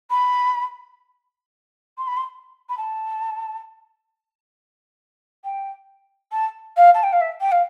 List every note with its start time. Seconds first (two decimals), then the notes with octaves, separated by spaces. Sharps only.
0.10 B5
1.98 C6
2.07 B5
2.17 C6
2.69 B5
2.77 A5
5.44 G5
6.32 A5
6.77 F5
6.94 A5
7.03 G5
7.13 F5
7.21 E5
7.40 G5
7.52 F5